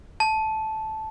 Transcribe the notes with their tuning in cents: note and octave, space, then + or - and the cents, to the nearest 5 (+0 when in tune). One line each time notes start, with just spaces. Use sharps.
A5 -10